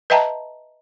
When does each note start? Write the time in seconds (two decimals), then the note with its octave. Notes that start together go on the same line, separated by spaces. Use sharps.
0.10 B4 D#5 E5 G5 A5 A#5